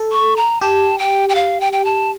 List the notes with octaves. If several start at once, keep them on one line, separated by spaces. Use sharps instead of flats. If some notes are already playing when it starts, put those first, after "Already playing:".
Already playing: A4
C#6
A#5
G4 A5
G5
G5
F5
G5
G5
A5